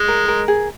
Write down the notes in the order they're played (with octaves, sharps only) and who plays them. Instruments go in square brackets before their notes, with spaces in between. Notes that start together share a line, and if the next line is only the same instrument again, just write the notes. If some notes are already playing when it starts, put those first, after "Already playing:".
Already playing: [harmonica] G#3
[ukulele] A#4
A#4
G#4